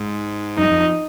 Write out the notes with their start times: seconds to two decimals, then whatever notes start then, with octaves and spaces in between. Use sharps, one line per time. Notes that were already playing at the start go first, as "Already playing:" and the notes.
Already playing: G#2
0.58 F#2 D#4
0.71 F2